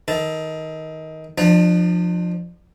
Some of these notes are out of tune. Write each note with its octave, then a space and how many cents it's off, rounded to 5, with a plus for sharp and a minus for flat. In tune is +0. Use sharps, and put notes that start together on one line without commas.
D#3 +20 A4 +0
F3 +10 D4 +40